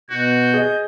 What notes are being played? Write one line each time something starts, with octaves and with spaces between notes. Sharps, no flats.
B2 F#4 G6
G#4 D#5